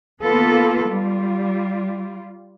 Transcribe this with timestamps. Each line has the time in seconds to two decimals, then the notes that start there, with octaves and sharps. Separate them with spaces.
0.21 D#3 A#3 B3 F4 A4 B4
0.87 G3 F4